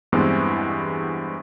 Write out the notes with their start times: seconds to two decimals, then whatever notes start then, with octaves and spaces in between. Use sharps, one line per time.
0.12 E2 G2 E3 G#3 B3 C4